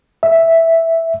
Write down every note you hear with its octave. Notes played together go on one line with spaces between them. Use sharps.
E5